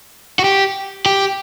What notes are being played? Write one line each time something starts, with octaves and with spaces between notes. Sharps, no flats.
F#4
G4
G4